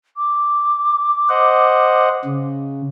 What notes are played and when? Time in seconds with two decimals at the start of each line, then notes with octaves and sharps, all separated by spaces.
0.17 D6
1.29 C5 D#5 F#5
2.25 C#3